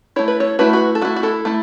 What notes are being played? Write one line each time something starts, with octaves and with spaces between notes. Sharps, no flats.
A3 E4 C#5
B4
A4 C#5
A3 E4 F#4 B4
F#4 B4
A4
A3 E4 F#4
F#4
E4 A4
A3 E4